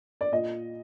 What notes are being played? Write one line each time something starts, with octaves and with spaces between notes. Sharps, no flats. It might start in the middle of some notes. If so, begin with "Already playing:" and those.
D5
A#2 D#5